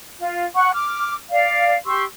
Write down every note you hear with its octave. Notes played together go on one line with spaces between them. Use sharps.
F4
F#5 C#6
D6 F6
D5 F5
G4 C6 C#6 E6